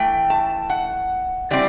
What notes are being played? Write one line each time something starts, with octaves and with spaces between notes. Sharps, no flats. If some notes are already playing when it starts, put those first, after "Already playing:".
Already playing: E3 A3 G5
A5
F#5
E3 G3 C4 D5